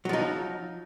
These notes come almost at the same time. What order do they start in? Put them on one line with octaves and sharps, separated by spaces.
F#3 F3 D#4